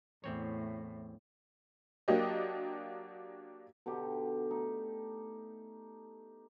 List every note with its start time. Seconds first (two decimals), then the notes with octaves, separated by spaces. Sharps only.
0.24 E2 A2 C4 C#5
2.08 F#3 A#3 D4 F#4 G4 D#5
3.86 B2 D3 D#4 G4
4.51 A3 D#4